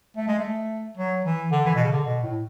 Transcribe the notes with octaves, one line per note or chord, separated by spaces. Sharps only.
A3
G#3
A3
F#3
E3
D3
E3
B2
C#3
D3
B2
A2